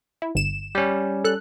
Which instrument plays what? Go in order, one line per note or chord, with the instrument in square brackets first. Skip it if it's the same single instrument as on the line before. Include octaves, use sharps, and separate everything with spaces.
[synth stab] E4
G1 E7
[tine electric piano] G3 C#4
[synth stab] A4 F#6